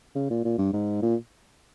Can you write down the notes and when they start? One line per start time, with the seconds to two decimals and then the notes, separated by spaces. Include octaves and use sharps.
0.15 C#3
0.30 A#2
0.45 A#2
0.58 G2
0.73 G#2
1.02 A#2